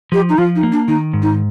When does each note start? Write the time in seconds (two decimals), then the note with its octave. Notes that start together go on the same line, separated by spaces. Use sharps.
0.12 F3 G4
0.29 D#4
0.38 F3 F4
0.55 D#4
0.63 A#3
0.71 D4
0.87 D#3 D#4
1.13 G#2
1.21 D#4